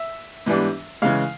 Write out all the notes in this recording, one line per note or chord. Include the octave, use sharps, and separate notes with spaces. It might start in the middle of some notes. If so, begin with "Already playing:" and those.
Already playing: E5
G#2 E3 G3 B3 D4
C#3 E3 G#3 F5